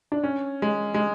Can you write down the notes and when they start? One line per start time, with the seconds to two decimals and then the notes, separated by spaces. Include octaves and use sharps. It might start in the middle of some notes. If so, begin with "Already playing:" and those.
0.12 D4
0.24 C#4
0.62 G#3
0.94 G#3